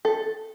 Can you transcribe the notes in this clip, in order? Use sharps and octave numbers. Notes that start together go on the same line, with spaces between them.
A4